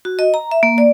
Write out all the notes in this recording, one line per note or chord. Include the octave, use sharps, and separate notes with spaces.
F#4
D#5
A#5
E5
A#3
D5